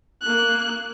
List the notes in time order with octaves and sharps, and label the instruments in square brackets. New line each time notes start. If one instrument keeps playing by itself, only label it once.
[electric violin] A#3 F#6